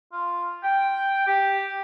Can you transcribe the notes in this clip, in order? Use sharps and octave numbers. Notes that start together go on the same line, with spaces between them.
F4
G5
G4